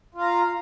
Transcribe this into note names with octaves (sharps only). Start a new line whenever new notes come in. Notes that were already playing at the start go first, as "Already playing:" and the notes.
F4 F5 A#5